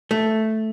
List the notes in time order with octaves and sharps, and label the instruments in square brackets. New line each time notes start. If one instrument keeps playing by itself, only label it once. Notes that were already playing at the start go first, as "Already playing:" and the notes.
[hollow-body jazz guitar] A3